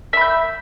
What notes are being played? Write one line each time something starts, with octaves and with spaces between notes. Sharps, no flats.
E5 B5 G6